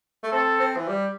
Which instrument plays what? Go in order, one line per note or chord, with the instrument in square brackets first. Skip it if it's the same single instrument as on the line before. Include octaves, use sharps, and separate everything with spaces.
[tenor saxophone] A3
[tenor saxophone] C4 [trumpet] A4
[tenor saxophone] C4
E3
G3